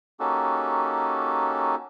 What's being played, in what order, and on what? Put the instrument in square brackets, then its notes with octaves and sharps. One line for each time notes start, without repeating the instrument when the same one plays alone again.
[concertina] A#3 C#4 D#4 F#4 G4 A4